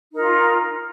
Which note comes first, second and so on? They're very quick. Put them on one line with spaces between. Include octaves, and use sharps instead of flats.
D#4 A#4 F4